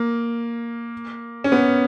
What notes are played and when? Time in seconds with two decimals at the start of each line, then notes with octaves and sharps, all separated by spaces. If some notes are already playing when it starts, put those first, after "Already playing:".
Already playing: A#3
1.44 C#4
1.52 B3